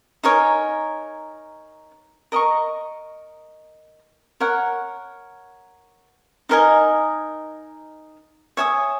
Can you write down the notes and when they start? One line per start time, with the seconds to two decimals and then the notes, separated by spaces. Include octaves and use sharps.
0.23 D#4 A#4 C#5 G#5
2.32 A#4 D#5 A#5 C#6
4.40 A#4 C#5 F#5
6.49 D#4 A#4 D#5 G#5
8.57 C#5 E5 G#5 D#6